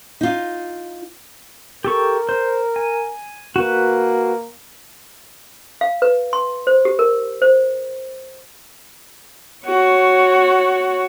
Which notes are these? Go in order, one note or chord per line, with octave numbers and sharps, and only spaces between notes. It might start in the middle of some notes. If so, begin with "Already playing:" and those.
D#4 F4
G4 A4 A#4 C#6
C5
G#5
A#3 F#4 B4
F5
B4
C6
C5
G4
A#4
C5
F#4 C#5